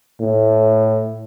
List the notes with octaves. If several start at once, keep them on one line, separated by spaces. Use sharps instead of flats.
A2